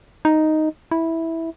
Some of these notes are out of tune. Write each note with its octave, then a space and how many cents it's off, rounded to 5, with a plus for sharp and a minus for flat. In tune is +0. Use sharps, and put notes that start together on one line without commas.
D#4 +0
E4 -10